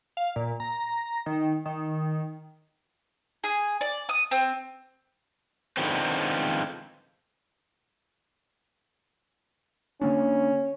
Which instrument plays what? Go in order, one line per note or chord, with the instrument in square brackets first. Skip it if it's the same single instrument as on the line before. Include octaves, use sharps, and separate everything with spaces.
[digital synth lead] F5
A#2
A#5
D#3
D#3
[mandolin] G#4
D5
D#6
C4
[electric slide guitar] D3 D#3 F3 G#3 B3 C4
[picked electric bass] D3 A#3 D4 [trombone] C#4